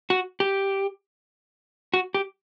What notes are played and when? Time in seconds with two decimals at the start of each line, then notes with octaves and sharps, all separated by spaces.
0.10 F#4
0.40 G4
1.94 F#4
2.14 G4